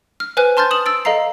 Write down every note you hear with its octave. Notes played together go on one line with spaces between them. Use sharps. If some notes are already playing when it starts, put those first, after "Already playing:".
F6
B4 C5 G#5 F6 F#6
A5 C6 F6 G6 A6
D#6 E7 F#7
E6 A6 D7
A4 D#5 F5 A#5 C7